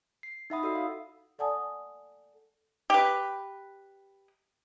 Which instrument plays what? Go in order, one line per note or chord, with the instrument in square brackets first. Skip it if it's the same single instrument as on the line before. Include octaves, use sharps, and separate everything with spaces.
[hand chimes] C7
D#4 E4 E5 F#5 B5 D#6
F#4 A4 D5 E6 C7
F5
[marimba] A4 D5 F#5 G#5 A5 D#6
[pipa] G4 B4